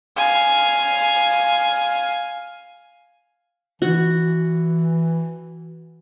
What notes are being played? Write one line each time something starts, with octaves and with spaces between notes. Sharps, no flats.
F5 G#5
E3 F#4